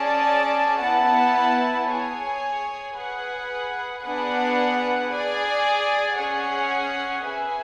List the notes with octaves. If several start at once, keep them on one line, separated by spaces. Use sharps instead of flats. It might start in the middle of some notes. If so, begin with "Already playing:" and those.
Already playing: C#4 G#4 D5 A5
B3 E4 B4 F#5 A5
G#4 C#5 G#5
G#4 B4 F#5
B3 D4 G#4 B4 F#5
G#4 D5 G#5
C#4 G#4 C#5 F#5
G#4 B4 E5 G#5